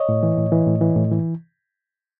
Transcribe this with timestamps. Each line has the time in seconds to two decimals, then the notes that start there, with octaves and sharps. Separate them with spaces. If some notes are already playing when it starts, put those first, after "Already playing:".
Already playing: C#5 D#5
0.09 A2
0.23 E3
0.37 A2
0.52 E3
0.67 A2
0.81 E3
0.96 A2
1.11 E3